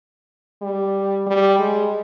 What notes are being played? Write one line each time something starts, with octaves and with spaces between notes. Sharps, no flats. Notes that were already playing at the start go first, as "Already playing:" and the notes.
G3
G3
G#3